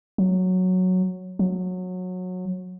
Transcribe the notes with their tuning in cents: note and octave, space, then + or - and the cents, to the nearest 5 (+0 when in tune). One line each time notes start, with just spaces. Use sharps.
F#3 -5
F#3 -20